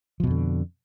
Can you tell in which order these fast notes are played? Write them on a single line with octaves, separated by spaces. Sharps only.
F3 B2 F2 D3